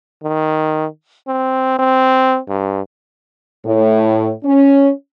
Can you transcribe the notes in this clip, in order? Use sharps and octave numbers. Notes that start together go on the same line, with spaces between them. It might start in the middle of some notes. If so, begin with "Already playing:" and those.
D#3
C4
C4
G2
A2
C#4